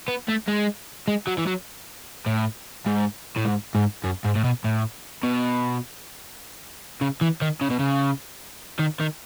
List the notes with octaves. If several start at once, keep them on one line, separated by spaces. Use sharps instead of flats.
B3
A3
G#3
G#3
F#3
E3
F#3
A2
G#2
A2
G#2
G#2
F#2
G#2
A2
B2
A2
B2
C#3
E3
D#3
C#3
B2
C#3
D#3
D#3